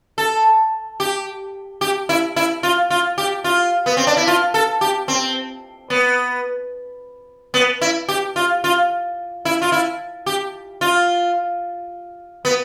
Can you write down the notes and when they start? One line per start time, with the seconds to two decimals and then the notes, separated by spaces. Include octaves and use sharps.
0.18 A4
1.00 G4
1.81 G4
2.09 E4
2.36 E4
2.63 F4
2.90 F4
3.18 G4
3.44 F4
3.86 B3
3.97 C4
4.07 D4
4.17 E4
4.27 F4
4.54 A4
4.81 G4
5.08 C4
5.90 B3
7.54 B3
7.81 E4
8.09 G4
8.36 F4
8.64 F4
9.45 E4
9.62 F4
9.72 E4
10.26 G4
10.81 F4
12.45 B3